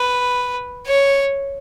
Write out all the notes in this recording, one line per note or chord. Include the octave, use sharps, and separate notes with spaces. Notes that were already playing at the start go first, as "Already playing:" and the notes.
Already playing: B4
C#5